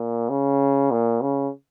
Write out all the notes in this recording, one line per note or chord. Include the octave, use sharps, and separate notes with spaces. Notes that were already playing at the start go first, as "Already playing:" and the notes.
Already playing: A#2
C#3
A#2
C#3